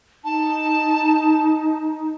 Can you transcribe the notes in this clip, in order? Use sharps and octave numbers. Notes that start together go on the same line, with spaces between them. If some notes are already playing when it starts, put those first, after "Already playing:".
D#4 A5